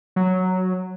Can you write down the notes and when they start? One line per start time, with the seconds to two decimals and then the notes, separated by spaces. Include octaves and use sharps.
0.16 F#3